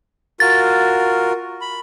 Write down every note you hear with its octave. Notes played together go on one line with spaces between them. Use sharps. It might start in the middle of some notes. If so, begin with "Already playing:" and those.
F4 F#4 A#4 A6
B5